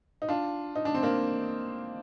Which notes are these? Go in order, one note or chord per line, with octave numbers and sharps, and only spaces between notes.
D#4
D4 F4
D#4
D4
C4
A#3 D4